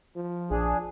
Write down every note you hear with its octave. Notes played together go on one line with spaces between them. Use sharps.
F3
A#1 D4 G#4